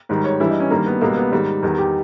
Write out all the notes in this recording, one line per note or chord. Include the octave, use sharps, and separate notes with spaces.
G#2 D#3 G3
C#5
G2 E3 G3 E4
D#4
C#4
G2 D#3 G3 A#3
B3
C#2 B2 G3 A#3
B3
G#2 D#3 G3
E2 D#3 G3
G4